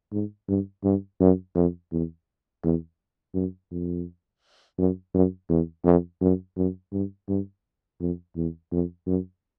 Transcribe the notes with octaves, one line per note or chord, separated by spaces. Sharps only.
G#2
G2
G2
F#2
F2
E2
E2
F#2
F2
F#2
F#2
E2
F2
F#2
F#2
G2
G2
F2
E2
F2
F#2